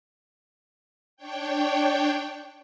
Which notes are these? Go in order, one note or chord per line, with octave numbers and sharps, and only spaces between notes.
D4 C#5 G5